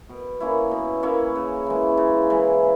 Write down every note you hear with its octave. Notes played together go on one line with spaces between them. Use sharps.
B2
A#3 C#4 E4
B2
A#3 C#4 E4
C#3
E3 G#3
C#3
E3 G#3